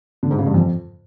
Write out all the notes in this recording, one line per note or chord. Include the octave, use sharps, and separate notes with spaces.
D3
G#2
C#3
G2
F2